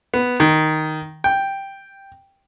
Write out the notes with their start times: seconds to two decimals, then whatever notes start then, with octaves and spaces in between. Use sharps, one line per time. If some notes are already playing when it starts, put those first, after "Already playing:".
0.14 B3
0.40 D#3
1.24 G5